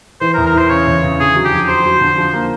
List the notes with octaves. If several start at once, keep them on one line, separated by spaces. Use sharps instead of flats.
E3 C5
A#4
E2
A#4
E3 C5
C#3 C#5
E2
C#3
D3 G#4
F#3
G4
F2
F#3 C5
F#3
D3
F3
A#3